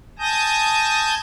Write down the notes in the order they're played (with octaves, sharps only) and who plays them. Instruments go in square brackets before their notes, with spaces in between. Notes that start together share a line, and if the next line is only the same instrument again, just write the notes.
[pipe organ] G#5 A5 D#6 G6 A#6